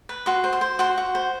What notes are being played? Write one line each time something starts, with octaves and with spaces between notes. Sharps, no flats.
B4
F#4 C6
C5
C6
C5
F#4 C6
F#4
C5